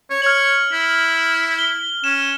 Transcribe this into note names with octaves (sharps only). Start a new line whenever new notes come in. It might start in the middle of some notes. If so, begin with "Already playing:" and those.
C#5
C#5 F6 F#7
E4
G7
C#4 E7